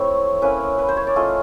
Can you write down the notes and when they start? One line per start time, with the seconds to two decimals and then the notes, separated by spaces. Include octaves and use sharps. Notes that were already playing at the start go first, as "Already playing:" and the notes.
Already playing: A3 C4 E4 C#5
0.42 A#3 C#4 E4 B4
0.78 B4
0.88 C5
0.97 C#5
1.07 D5
1.16 A3 C#4 F4 D#5